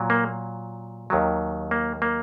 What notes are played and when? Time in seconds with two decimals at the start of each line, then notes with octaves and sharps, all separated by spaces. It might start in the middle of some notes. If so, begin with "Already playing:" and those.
Already playing: A#2 F#3
0.10 A#3
1.10 D#2 D#3 F#3
1.71 A#3
2.02 A#3